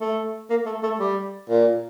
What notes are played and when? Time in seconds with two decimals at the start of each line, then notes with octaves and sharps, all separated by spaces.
0.01 A3
0.50 A#3
0.66 A3
0.83 A3
1.00 G3
1.49 A#2